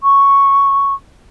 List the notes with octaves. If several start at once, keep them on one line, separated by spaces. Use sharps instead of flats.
C#6